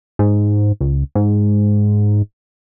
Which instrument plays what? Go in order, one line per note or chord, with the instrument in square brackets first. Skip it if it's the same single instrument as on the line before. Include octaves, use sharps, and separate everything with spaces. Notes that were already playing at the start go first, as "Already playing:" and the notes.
[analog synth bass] G#2
C#2
G#2